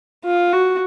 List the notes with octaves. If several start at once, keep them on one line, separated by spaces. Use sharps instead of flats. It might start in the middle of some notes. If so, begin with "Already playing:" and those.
F4
F#4